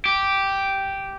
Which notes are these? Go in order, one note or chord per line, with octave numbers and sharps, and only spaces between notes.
G4